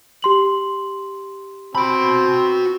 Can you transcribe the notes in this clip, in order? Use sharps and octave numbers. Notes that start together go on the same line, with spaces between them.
G4 C6 F#7
C4 F#4 B5